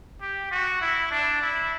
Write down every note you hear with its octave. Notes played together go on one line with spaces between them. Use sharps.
G4
F#4
E4
D4
E4